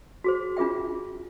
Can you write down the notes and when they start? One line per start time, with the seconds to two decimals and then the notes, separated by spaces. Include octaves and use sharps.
0.24 F#4 G#4 C5
0.57 D4 F4 G#4 E5 G5